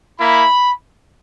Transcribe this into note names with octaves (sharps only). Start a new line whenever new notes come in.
A#3 E4 B5